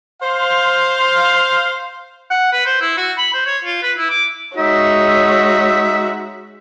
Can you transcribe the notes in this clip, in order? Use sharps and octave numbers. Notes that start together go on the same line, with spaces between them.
C5 F5
F#5
B4
C5
E4
F#4
B5
C5
C#5
F4
B4
E4
D6
G#3 D#4 F#4 C#5 E5